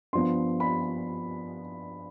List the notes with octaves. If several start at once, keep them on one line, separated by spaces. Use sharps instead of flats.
G2 F3 B3 C6
B5